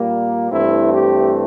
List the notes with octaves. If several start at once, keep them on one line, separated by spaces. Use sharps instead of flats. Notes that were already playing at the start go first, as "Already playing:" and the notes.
Already playing: A#2 G3 A#3
G2 E3 A3 C4 E4
G4